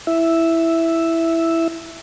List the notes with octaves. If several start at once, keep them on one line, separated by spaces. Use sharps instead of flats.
E4 E5